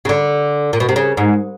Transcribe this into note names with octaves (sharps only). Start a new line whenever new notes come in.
C#3
D3
A#2
B2
C3
C#3
G#2